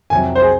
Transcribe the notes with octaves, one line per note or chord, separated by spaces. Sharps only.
F2 C3 F#3 G#5
C5
G#4